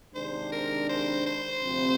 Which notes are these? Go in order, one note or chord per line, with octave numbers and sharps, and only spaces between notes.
C3 D#3 G#3 D4 C5
A#4
C5
C5
D2 C3 F3 C4